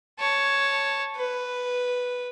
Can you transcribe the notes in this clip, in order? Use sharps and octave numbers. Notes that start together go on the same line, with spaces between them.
C#5 A5
B4